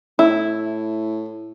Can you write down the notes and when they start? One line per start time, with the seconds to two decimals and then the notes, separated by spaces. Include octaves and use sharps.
0.19 A2 E4